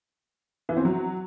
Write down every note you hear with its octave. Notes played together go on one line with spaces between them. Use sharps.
E3
C4
F#3